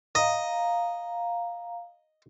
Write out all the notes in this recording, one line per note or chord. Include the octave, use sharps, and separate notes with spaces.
D#5 F5 A#5